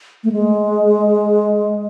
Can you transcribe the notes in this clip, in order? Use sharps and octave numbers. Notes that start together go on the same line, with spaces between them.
A3
G#3